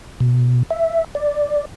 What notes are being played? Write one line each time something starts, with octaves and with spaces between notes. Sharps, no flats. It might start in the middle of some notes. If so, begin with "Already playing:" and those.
B2
E5
D5